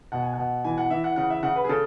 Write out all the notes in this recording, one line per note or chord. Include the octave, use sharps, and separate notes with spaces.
B2 F#5
G#5
B2 F#5
E3 G#5
F#5
E3 E5
F#5
C#3 F#5
E5
C#3 F#5
B4
G#4
C#3 A4